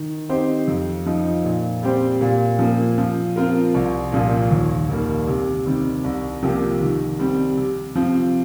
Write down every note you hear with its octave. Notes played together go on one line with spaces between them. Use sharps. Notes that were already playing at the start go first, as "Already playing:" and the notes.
Already playing: D#3
C4 D#4 G4 C5
F2
F3 D#4
A#2
G3 C4 G4 C5
A#2
F3 A#3
F3
C4 F4 A#4
C2
A#2 F3 A#3
D#2
D#3 G3 A#3
C3
D#3 G3 C4
C2
C3 F3 A#3 G4
D#3
G3 C4 G4
C3
F3 C4